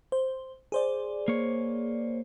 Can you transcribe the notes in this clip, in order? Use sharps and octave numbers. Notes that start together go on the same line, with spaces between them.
C5
G#4 C5 D5
A#3 C#5